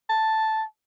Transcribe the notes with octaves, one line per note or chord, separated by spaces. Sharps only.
A5